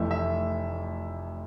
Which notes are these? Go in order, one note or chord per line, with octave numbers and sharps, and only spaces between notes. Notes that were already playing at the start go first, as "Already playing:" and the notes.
Already playing: F1 F2 E3 A3 E5
E5